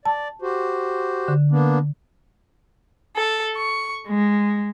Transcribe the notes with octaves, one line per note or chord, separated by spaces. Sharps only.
D5 A5
F#4 G4 C5
D3
A#3 B3 D4
A4
C#6
G#3